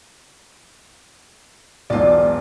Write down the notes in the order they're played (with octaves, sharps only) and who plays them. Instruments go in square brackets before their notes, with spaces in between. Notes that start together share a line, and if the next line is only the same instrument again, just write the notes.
[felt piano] E1 B1 [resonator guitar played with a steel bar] F4 D5